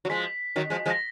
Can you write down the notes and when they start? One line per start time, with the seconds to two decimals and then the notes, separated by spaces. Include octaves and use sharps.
0.05 F#3
0.10 F3 G#3 B6
0.56 D#3 F#3
0.70 F3 G#3
0.86 F3 G#3
0.90 A#6